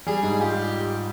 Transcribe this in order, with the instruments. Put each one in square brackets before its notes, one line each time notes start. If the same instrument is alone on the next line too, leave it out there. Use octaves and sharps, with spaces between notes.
[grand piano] G3 [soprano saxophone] G#4
[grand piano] G#2
[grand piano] F4 [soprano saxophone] G4